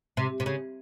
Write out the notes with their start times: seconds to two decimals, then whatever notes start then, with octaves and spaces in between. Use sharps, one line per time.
0.17 C3
0.40 C3
0.46 C#3